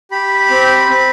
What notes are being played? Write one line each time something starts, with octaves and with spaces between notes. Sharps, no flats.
G4 B5
C4
C4